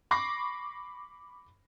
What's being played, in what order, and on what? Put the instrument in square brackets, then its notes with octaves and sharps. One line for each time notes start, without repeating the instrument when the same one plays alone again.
[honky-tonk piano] B5 C#6 D6 A#6 C7